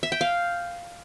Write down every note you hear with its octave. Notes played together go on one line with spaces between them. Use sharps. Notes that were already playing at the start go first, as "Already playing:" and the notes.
E5
G5
F5